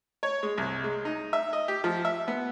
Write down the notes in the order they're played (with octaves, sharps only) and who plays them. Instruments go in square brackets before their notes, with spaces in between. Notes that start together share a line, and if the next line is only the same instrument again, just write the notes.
[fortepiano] C#5
G#3
C2
G#3
D#4
E5
D#5
G4
F3
E5
B3